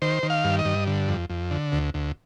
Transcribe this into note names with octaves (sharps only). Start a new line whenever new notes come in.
D#3 C5
D#3
F5
G2
D#5
G2
D3
F2
F2
D3
D2
D2